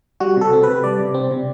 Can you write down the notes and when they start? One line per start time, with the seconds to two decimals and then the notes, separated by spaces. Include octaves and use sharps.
0.20 G3 F#4
0.37 C3 A4
0.53 C4
0.63 C3 B4
0.84 G3 D5
0.99 C3
1.14 C4
1.31 C3